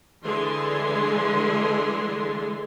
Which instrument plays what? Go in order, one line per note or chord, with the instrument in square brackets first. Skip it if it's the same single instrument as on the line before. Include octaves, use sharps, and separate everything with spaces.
[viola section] D3 E3 G#3 G#4 C6